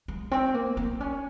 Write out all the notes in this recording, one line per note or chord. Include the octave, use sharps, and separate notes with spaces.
G#3
C4
A#3
C4
C#4